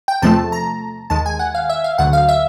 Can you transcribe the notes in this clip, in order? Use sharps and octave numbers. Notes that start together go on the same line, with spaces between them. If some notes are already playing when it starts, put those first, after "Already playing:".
G5
E2 C3 F3 A3 A5
A#5
D#2 D#3 G#3 A5
G#5
F#5
F5
E5
F5
D2 D3 F#3 F#5
F5
E5